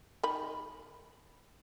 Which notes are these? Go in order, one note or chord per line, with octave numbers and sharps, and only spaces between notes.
D#3 D#4 B5